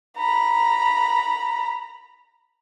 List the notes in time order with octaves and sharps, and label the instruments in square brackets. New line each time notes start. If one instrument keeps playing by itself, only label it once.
[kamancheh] A#5 B5